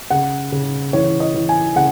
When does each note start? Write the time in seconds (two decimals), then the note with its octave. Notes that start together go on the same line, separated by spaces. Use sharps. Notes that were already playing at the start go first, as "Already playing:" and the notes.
0.10 C#3 F#5
0.52 C#3
0.93 E3 C#5
1.20 D#5
1.34 E3
1.49 G#5
1.76 C#3 F#5